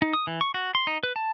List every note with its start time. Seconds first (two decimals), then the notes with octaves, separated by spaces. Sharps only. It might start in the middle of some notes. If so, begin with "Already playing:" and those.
0.02 D#4
0.13 D#6
0.27 E3
0.41 C#6
0.54 F#4
0.75 C6
0.87 D#4
1.03 B4
1.16 A5